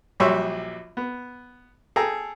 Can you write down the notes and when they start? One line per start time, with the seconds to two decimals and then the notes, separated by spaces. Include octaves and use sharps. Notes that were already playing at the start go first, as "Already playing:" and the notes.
0.20 A#1 F#3 G3 C#5 E5 C6
0.97 B3
1.96 G#4 A4 G5 A#5